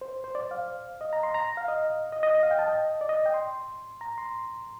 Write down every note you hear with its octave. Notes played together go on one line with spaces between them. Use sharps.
C5
C5
D5
F5
D#5
A#5
C6
A#5
F5
D#5
D#5
D#5
D#5
F5
G5
A5
D#5
D5
D#5
G5
C6
A#5
C6